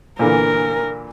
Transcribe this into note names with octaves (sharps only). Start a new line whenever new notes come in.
A#2 D3 E3 A#4